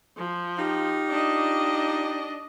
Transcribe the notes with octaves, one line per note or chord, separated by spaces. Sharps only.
F3
D#4 F4 G4
D4 D#5